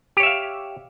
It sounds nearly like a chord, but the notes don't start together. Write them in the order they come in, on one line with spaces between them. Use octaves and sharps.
G4 C#5 E5 F5